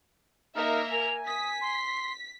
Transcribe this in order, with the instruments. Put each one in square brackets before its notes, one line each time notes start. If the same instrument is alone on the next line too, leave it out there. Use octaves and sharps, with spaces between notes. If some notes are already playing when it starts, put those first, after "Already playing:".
[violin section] A#3 A#4 E5 [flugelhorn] D#4 [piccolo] F6
[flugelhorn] G#5 [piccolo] F7
[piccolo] D#6 [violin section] B6
[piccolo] C6